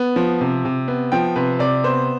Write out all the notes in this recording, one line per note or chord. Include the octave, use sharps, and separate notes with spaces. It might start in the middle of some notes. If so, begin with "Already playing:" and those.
Already playing: B3
F3
C3
C3
B3
F3 G5
C3 B4
C3 D5
B3 C5